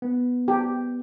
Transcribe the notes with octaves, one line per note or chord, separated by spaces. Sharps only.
B3
G4